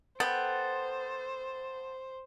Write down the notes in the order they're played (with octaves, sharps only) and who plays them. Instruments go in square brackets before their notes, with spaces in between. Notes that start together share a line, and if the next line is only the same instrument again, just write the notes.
[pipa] B3 [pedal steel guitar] A4 G5 [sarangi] C5